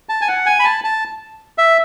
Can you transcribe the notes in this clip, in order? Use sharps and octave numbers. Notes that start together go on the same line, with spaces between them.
A5
G#5
F#5
G#5
B5
A5
A5
E5